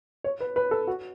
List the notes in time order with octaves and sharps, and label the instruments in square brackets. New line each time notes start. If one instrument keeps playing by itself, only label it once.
[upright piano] C#5
B4
B4
A4
F#4